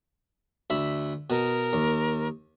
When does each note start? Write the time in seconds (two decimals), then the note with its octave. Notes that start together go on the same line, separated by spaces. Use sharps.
0.70 D2 E5 B5
1.30 B2 A#4
1.73 D#2